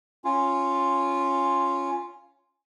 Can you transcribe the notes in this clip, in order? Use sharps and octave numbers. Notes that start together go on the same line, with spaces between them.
C#4 F4